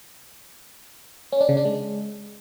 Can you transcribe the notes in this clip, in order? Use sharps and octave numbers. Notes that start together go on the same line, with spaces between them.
C#4
D4
C#3
D4
G#3